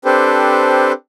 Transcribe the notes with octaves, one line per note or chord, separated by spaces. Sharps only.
C4 D4 G4 A4 B4 C5